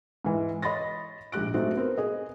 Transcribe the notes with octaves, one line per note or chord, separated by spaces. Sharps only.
G#2 E3
C#5 D#5 B5 C6 A6 A#6
A#1 G#2 G4 F#6 D7
F#3 A3 C4 D4 D#4
B3 C4 A#4
G#4 D#5